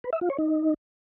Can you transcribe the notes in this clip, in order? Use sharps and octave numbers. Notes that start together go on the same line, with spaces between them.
B4
E5
F4
C#5
D#4